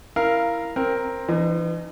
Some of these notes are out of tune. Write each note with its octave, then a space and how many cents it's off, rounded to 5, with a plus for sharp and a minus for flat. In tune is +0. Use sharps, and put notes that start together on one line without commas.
E4 +0 A#4 +0 F5 -15
C4 +5 A#4 +0
E3 +30 D#4 -30